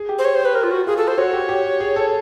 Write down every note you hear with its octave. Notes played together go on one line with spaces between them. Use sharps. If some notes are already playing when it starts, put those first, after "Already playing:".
Already playing: G#4
G4
C5
C#5
C5
B4
A#4
F4
F#4
F4 G#4
A4
C5
F#4 C#5
G4
G4
G#4
A4